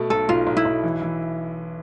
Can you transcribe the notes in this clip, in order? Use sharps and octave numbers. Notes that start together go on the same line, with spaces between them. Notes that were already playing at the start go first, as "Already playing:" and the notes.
Already playing: B2 A3
B1 A4
B1 F4
B1
E4
B1
E3
E3